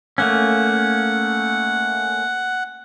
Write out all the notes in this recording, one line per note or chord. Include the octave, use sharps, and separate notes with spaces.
A3 A#3 C#4 F#5